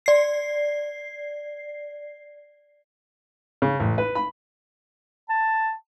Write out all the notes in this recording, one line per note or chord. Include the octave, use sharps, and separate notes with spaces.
D5 C7
C#3
A1
B4
B5
A5